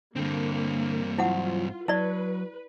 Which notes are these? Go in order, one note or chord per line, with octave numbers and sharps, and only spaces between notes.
G2 D3 A#3 C4
F#3 E4 F4 C5 F#5
F#3 E4 B4 D5